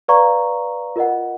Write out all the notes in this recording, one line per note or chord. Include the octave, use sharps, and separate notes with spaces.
B4 D5 F5 A#5 C#6
F4 A#4 D#5 F#5